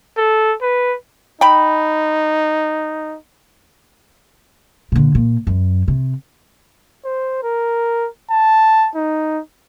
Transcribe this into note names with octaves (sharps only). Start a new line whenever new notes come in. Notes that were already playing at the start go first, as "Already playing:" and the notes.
A4
B4
D#4 G5 B5
A#2 D3
A#2
F#2
C3
C5
A#4
A5
D#4